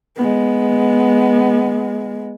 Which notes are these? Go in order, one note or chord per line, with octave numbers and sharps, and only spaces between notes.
G#3 B3